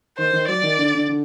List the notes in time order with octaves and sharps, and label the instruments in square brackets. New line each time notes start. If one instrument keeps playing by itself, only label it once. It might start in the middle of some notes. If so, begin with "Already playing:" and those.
[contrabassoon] D#3 [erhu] C5
[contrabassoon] D#3
[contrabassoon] F#3 [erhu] D5
[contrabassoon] D#3
D3
D3
D3